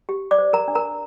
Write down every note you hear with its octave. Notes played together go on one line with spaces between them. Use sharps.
G4
D5 D6
C5
A#4 A#5
D4
A#4 A#5